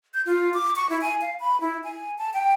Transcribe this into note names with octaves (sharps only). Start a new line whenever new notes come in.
G6
F4
D6
C#6
E4
G#5
F5
B5
E4
G#5
A5
G5